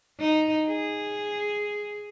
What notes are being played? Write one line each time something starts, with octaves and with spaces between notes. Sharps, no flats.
D#4
G#4